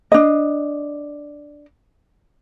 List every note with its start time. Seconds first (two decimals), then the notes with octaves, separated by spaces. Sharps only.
0.12 D4 D#5